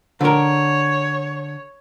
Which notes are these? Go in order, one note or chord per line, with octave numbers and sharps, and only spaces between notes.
D3 A#4 C#5